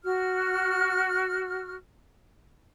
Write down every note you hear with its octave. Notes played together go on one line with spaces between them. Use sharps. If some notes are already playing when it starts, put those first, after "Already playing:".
F#4 F6